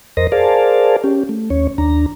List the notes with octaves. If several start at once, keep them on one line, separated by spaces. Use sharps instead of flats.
F2 A#4 C5 D#5 A#6
G#4 A#4 C5 D5 F5 A5
C#4 G4
A3
D#2 C#4 C#5
D#2 D4 A#5